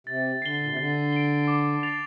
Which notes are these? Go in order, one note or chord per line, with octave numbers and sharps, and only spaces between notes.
C3 A6
D3 C7 G7
A#2
C3
D3 A6
D7 G7
D6
A6 C7 F7